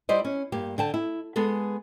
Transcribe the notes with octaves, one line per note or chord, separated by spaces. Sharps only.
G3 E4 C5 D5 D#5
C#4
G2 A#3 G4
D3 G5 A5
E4
G#3 B3 G#4 A4